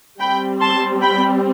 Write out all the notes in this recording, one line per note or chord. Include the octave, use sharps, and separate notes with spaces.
G3 C4 G5 B5
A5 C6
G5 B5